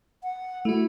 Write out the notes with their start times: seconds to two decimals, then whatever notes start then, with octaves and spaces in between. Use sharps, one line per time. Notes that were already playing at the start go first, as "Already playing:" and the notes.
0.23 F#5
0.65 A3 E4 F#4